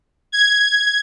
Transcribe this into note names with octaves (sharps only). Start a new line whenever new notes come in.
G#6